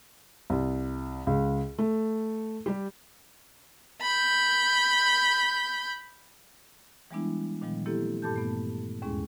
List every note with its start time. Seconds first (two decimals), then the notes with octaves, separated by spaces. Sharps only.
0.50 C2
1.27 C#2
1.79 A3
2.66 G3 G4
4.02 B5 G6
7.11 E3 G3 G#3 B3 D4 E4
7.62 A#2 D#3 F3 G3 B3
7.86 A#3 C4 E4 G4 A4
8.22 G2 A#2 G4 A4 A5 G6
8.36 A3 B3
9.02 D#2 G#2 G#3 C#4 E4 G#4